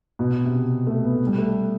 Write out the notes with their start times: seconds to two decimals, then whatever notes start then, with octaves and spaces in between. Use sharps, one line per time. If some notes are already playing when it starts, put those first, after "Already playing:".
0.19 B2
0.45 C3
0.87 A3
1.04 B3
1.15 A3
1.27 G3
1.38 A3